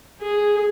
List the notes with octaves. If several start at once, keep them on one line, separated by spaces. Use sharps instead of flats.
G#4